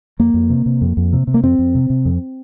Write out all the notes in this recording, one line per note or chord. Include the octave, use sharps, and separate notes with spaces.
F2 A#3
F2
C3
C3
F2
F2
C3
C3
A#3
F2 C4
F2
C3
C3
F2